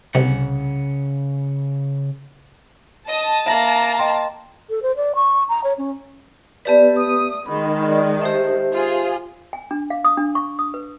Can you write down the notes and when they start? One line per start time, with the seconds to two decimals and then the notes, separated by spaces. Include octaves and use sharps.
0.15 C2 C#3 F#5
3.08 D#5 A5 D#6
3.46 A#3 E5 A#5 A#6 F#7
3.99 D#5 G5 C6
4.70 A4
4.82 C5
4.96 D5
5.15 C#6
5.49 A#5
5.64 C#5
5.78 C#4
6.65 B3 G4 B4 D5 E5 A5
6.96 D#6
7.46 D#3 G#3 B5
7.83 D3
8.21 G4 A4 C5 E5
8.73 F4 G#4
9.53 G#5
9.71 D4
9.90 F5
10.05 D#6
10.18 D4
10.35 C#6
10.59 D#6
10.74 B4